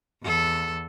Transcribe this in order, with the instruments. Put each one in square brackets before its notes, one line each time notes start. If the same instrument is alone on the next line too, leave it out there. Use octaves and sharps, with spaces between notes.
[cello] E2 A4